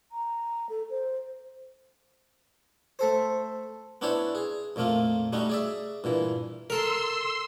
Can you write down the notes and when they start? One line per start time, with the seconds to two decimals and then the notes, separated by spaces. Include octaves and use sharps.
0.12 A#5
0.69 A4
0.90 C5
2.99 A3 A4 C5
4.01 B3 C#4 D4 E4 C5 C#5
4.35 G#4
4.76 F2 A#2 A3 A#3 F4
5.33 G3 A3 C#4 D#4 F#4
5.49 G#4 D5 E5
6.04 G2 A#2 E3
6.70 A4 A#4 C6 E6